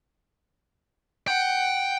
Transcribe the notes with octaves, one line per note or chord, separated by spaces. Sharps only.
F#5 G5